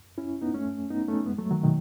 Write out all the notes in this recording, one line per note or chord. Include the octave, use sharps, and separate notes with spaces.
C#4 E4
B3 D#4
A3 C#4
B3 D#4
A3 C#4
G#3 B3
F#3 A3
D#3 F#3
B2 D#3